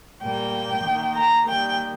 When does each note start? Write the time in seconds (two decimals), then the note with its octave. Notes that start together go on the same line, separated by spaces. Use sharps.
0.23 A#2 G3 A#3 G5
0.84 D#3 A#3
1.15 A#5
1.47 D#3 G3 A#3 G5